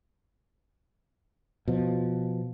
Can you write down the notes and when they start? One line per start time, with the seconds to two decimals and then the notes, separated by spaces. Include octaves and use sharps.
1.68 B2 F3